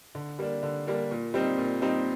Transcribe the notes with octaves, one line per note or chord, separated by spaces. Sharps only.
D3
G3 A#3 D4
D3
G3 A#3 D4
A#2
G3 C4 D#4
A#2
G3 C4 D#4